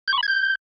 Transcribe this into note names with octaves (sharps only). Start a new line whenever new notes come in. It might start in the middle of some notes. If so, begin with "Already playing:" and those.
G6
C#6
B5
G#6
G6